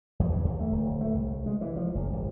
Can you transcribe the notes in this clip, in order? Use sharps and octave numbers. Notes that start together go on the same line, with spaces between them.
E2
G2
D#2
A3
D1
A3
C2
G#3
E3
F3
F#1
G#1